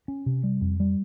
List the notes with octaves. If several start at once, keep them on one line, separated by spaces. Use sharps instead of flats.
C#4
C3
G3
F2
G3